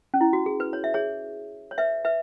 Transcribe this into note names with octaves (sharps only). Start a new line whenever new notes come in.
C#4
E4
F#4
G#4
B4
C#5
E5
G#4 C#5
C#5
B4 E5
B4 E5